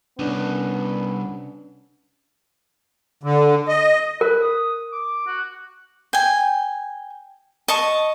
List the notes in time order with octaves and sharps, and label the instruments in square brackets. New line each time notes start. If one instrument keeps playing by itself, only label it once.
[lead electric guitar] C2 [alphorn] B3 [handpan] C#4 D4
[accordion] D3
D#5
[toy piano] A#4 [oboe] B4
[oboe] D#6
D6
F#4
[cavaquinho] G5 G#5
D#5 A5 C#6